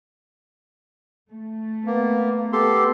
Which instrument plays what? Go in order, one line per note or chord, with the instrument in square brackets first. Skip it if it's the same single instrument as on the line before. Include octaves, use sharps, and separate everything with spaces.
[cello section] A3
[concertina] A#3 [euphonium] B3
[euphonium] B3 [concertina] G4 A4 C6